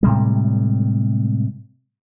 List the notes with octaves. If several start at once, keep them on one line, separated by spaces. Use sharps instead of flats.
A2 C3 G3 G#3